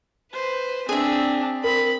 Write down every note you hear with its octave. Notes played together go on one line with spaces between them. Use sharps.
B4 C5
C4 D4 G#4 E5
C4 A#4 B5